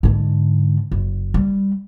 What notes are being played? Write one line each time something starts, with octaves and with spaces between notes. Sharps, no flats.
G#2 D3
F#1
G3